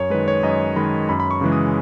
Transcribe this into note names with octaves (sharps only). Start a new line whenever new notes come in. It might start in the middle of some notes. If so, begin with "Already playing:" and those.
Already playing: F#2 C#5
D#3 G#3 B4
C#5
F#2 D#5
D#3 G#3 B5
F#2 B5
B5
C#6
C#3 E3 G#3
D#6